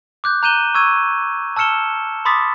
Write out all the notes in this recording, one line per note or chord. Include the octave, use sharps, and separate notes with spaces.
D6 F#6 G6
A#5 F#6 G6 D#7 E7 G7
C#6 E6 G#6 D#7
A5 E6 F6 C#7 E7 G7
B5 C6 D6 D#6 A6 B6